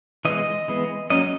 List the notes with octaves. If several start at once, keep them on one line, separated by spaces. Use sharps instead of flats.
E3 G#3 B3 D#5
E3 G#3 B3
F#3 A#3 C#4 D#5